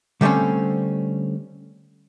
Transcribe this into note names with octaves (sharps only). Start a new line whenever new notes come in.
D3 G3 A3 C4 C#4